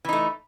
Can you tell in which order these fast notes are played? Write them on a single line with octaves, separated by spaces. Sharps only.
E3 D#4 A3